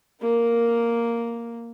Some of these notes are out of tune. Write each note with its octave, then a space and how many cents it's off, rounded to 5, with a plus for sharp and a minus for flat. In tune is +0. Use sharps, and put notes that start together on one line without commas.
A#3 +0 A#4 +0